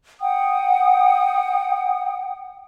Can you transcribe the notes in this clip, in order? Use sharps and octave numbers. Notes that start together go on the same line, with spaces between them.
F#5 G5 D#6